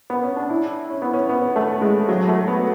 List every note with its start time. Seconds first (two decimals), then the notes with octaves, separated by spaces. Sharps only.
0.10 B3
0.23 C#4
0.36 D4
0.50 E4
0.90 C#4
1.02 B3
1.13 C#4
1.29 B3
1.56 A3
1.81 G#3
2.09 F#3
2.28 A3
2.48 B3